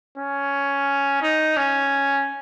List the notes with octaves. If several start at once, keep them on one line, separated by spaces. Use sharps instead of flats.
C#4
D#4
C#4